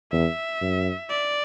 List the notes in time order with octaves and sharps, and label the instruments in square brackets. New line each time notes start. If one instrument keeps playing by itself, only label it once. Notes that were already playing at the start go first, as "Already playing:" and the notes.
[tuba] E2 [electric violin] E5
[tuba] F#2
[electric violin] D5